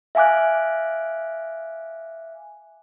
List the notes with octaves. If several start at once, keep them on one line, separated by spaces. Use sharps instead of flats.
E5 F5 G#5 D6 F#6